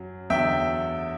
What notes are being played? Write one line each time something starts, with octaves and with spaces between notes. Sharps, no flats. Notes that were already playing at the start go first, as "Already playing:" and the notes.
Already playing: F#2 F#3
E2 D3 F#3 E5 G5